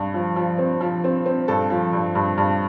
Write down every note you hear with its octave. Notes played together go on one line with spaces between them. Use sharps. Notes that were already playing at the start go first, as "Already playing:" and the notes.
Already playing: G2
F3
F3
C4
F3
C4
C4
G2 A4
F3
G2
G2
G2